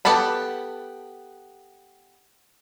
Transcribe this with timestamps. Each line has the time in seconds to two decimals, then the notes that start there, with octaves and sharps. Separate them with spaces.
0.05 B3 G4 A4 A5 B5